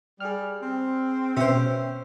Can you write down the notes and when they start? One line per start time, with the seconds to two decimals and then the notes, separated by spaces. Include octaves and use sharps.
0.20 G3 G#4 F6
0.63 C4
1.37 B2 B3 C#4 C5 E5 G5